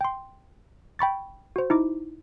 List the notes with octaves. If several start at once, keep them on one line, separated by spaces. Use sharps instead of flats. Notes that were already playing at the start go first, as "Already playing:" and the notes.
G5 C6
G5 B5 C#6 A6
F#4 C5
D#4 E4 D6